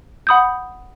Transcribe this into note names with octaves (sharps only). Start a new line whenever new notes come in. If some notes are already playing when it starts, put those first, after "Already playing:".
F#5 B5 D#6 G6